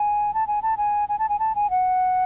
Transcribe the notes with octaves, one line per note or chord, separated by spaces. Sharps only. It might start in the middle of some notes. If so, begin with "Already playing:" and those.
Already playing: G#5
A5
G#5
A5
G#5
G#5
A5
G#5
A5
G#5
F#5